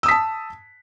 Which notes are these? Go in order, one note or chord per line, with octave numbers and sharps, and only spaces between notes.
A5 D#6 E6 B6